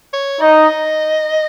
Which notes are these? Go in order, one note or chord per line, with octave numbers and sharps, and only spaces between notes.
C#5
D#4 D#5